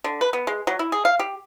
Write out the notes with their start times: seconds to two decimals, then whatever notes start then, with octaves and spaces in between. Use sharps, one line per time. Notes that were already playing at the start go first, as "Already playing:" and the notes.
0.04 D3
0.21 B4
0.33 B3
0.47 G#3
0.67 F#3
0.79 E4
0.92 G#4
1.05 F5
1.19 G4